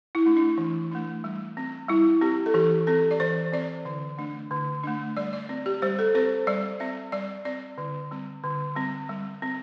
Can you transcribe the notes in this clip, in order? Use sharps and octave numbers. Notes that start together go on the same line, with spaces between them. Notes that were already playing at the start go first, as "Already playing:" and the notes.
E4
A3 D4
D4
E3
A3 D4
G3
C4
G3 E4
C4 G4
A4
E3 G4
C4 A4
D5
E3 C5
C4 D5
D3
A3 D4
D3
A3 D4
G3 D5
D5
C4
G4
G3 C5
A4
C4 C5
G3 D5
C4 E5
G3 D5
C4 D5
D3
G3 C4
D3
G3 C4
G3
C4